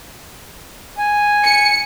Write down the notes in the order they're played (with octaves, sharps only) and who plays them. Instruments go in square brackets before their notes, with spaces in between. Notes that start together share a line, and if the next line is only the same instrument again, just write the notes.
[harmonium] G#5
[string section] C#7